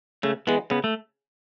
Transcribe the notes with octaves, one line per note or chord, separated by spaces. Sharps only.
C#3 A3
E3 G#3 B3
C#3 B3
A3